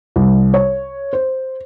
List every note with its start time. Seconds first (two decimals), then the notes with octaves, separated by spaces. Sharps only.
0.16 C2
0.54 C#5
1.13 C5